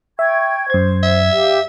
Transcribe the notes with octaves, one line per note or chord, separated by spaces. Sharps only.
E5 G5 C#6 G#6
F#2 C5 G#6
E5
G4 F5